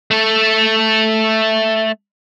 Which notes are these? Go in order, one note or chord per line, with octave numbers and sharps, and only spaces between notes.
A3 A4